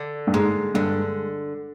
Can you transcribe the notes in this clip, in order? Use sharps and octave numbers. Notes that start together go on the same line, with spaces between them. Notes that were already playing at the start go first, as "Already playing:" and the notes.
Already playing: D3
G2
G#2 G#3
G2 D3